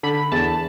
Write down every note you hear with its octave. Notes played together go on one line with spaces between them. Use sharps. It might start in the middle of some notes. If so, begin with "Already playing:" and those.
D3 B5
E2 A5